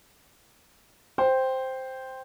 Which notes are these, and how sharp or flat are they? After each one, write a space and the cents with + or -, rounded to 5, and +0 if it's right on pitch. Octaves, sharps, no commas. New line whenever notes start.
C5 +0 G5 +0